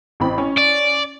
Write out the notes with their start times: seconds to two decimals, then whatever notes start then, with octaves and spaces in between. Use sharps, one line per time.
0.20 A1 C4 B5
0.38 C#4
0.57 D5